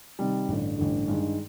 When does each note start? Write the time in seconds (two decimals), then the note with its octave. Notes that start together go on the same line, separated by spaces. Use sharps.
0.19 C3 D#3 G3
0.48 A1 G2 D3
0.78 A1 G2 D3
1.08 G2 D#3 G#3